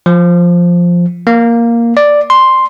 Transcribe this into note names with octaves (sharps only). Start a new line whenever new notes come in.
F3
A#3
D5
C6